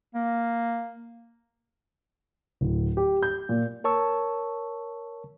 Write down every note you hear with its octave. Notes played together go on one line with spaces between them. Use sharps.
A#3
D1
G4
G6
A#2
A#4 C#5 A5 C#6 E6